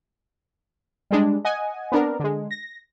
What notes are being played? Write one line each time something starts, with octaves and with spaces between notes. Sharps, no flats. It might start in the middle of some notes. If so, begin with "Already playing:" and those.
G3 G#3 D4
D#5 F#5 G#5
B3 C4 D4 A#4
D3 G#3
A#6